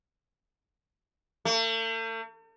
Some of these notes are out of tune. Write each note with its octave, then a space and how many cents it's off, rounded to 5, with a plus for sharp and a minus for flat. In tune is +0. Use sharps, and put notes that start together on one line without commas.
A3 +45